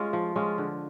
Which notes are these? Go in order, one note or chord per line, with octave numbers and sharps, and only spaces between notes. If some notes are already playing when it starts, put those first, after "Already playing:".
Already playing: G#3 C#4 F4
F3
G#3 C#4 F4
D3